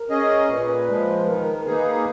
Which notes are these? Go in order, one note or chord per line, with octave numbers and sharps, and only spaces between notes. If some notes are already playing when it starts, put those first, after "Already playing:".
Already playing: A#4
C#4 G#4 D#5
A#2 B4
F3 G#3
D#3 A#4
A#3 D#4 G#4 B4